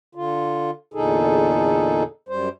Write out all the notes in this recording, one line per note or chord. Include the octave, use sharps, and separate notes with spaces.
D3 F4
E2 A#2 D3 D#4 G#4 A4
F#2 G3 C5